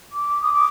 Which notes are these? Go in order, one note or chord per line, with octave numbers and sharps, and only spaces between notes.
D6
D#6
D6